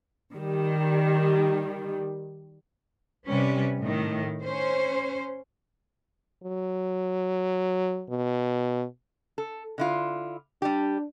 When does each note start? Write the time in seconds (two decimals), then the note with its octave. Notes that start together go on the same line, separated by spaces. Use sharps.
0.34 D#3 G3
3.26 C3 G3 C#4 B4
3.81 A2 D#3
4.41 C#4 C5
6.43 F#3
8.10 B2
9.38 A4
9.78 D3 E4 F4
10.62 G3 D4 G4